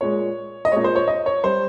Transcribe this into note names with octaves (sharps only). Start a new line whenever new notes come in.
A#2 G#3 C#5
D#5
A#2 G#3 C#5
C5
C#5
D#5
C#5
G3 C5